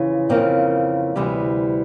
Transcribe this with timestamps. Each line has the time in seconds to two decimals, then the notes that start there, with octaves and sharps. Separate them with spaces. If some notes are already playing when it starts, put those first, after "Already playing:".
Already playing: F2 C#3 E3
0.29 F2 C#3 E3 A#3 C4
1.16 D2 C3 E3 G3